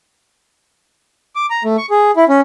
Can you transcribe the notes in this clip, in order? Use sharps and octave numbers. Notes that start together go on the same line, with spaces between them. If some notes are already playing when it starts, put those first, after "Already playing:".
D6
A#5
A3
C#6
G#4
E4
C#4